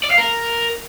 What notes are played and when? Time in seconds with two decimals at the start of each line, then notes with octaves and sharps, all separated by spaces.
0.03 D5
0.11 F5
0.18 A#4